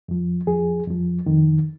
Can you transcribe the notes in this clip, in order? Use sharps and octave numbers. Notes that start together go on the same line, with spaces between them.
F2 F3
F2 F3 G#4
F2 F3
F2 D#3